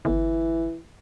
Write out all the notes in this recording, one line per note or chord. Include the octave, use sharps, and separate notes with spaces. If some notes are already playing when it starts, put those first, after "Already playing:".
G1 E3